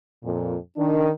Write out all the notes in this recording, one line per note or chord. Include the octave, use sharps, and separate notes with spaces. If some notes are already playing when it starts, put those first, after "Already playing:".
F2 A#2
D#3 D4